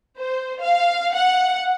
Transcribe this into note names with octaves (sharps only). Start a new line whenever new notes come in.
C5
F5
F#5